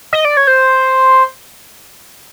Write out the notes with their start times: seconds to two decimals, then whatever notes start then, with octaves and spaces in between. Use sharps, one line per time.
0.13 D#5
0.25 D5
0.37 C#5
0.47 C5